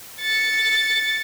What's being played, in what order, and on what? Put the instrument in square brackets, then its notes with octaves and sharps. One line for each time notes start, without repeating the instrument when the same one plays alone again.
[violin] A6 C#7